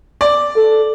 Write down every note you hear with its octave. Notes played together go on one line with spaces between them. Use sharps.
D5
A4